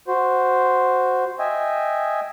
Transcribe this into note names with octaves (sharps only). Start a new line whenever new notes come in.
F#4 C5
D#5 E5 G5 G#5